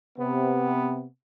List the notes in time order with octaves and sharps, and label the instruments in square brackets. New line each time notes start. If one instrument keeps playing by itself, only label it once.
[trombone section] C3 B3